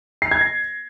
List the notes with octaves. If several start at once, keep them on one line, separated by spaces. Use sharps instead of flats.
C7
G#6
A#6